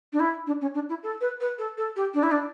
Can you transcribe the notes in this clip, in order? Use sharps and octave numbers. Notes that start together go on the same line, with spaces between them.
D4
E4
D4
C#4
D4
E4
A4
B4
B4
A4
A4
G4
D4
E4
D4